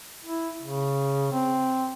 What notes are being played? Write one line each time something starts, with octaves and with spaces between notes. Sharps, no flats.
E4
C#3
C4